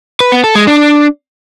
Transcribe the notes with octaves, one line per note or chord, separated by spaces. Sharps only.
B4
B3
A4
G#3
D4